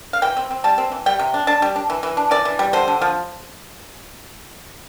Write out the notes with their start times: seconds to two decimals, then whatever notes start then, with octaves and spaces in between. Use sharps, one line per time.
0.13 F5
0.22 E3 G5
0.37 C4
0.51 C4
0.64 G3 A5
0.78 C4
0.92 E3
1.06 G3 G5
1.19 C3
1.34 D4
1.47 D4 A5
1.62 G3
1.76 D4
1.90 E3
2.03 E3
2.17 D4
2.31 E3 D5
2.45 E3
2.59 G3
2.73 D3 C5
2.88 D3
3.01 F3